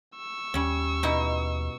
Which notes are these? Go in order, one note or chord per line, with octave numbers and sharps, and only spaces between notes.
C#6 E6
D#2 G3 C#4
B2 D#4 E4